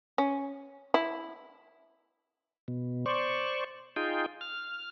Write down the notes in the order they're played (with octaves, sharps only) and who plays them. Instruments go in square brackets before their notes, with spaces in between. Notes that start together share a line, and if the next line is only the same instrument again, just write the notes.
[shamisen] C#4
E4
[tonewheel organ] B2
C5 D5 C#6
D#4 F4 G#4 G5
F6